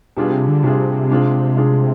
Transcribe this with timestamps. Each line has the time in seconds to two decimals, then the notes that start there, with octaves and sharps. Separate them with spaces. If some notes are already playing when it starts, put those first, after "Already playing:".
0.17 B2 G3 D4 F4 G#4
0.32 C3
0.48 D3
0.63 C3 G3 D4 F4 G#4
1.10 G#3 D4 F4 G#4
1.57 G#3 D4 F4 G#4